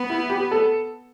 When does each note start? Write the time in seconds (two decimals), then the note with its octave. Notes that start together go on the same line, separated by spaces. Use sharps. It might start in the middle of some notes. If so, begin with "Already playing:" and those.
Already playing: B3
0.10 E4
0.30 G4
0.52 A4